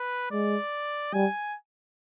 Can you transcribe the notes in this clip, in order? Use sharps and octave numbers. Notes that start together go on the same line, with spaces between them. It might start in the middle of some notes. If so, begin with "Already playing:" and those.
Already playing: B4
G#3 D5
G3 G#5